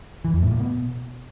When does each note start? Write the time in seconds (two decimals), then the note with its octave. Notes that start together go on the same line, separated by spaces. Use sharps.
0.25 E3
0.33 F2
0.42 A2
0.51 A#2
0.60 B2